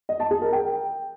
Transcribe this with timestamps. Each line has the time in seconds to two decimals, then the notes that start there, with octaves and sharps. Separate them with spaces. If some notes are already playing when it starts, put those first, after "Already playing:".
0.09 D#5
0.20 A5
0.31 G#4
0.42 A#4
0.53 G5